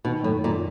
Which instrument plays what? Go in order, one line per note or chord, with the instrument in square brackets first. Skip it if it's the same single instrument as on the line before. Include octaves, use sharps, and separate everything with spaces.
[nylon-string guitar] B2 [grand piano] D#3
[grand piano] F#2 [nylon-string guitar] A2
[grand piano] F#2 [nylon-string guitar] A#2